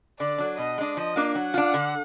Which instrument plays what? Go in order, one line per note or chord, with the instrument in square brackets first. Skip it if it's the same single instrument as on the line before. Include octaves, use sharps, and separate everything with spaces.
[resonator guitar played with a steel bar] D3 [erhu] D5
[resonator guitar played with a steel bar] F#3 D4
[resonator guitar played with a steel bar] B2 [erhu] D#5
[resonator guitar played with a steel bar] G#3 D4
[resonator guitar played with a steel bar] F3 [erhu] D#5
[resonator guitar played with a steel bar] A#3 D4 F4
[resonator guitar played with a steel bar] F#3 [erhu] F#5
[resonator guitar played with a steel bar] D4 F4
D3